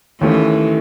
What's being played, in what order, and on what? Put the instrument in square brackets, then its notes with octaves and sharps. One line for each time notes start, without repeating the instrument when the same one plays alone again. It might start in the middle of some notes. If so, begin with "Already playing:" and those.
[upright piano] D#2 D#3 A3 C#4 [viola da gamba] E3